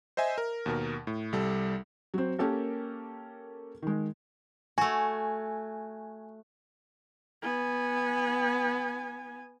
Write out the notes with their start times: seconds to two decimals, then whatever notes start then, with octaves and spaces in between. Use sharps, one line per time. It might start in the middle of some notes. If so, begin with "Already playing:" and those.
0.17 C5 D#5 E5 G#5
0.38 A#4
0.66 D#2 B2 A#4
1.07 A2
1.33 C2 G3 A4
2.14 F#3 C4
2.39 A#3 C#4 G4 A4 A#4
3.82 D#3 G#3
4.78 A3 F#4 G#5
7.42 B3 G#5